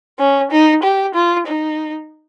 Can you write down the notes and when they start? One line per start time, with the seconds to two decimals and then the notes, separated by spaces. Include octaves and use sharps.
0.19 C#4
0.51 D#4
0.83 G4
1.15 F4
1.47 D#4